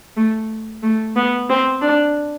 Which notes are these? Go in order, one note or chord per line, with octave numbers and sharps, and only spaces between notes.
A3
A3
B3
C4
D4